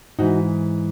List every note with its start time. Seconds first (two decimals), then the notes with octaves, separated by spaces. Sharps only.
0.19 G#2 E3 D#4 F#4